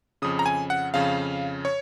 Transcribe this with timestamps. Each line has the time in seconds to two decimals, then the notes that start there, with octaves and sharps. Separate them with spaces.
0.22 F2 C#3 D#6
0.39 A#5
0.46 G#5
0.70 F#5
0.94 F2 C#3 F5
1.65 C#5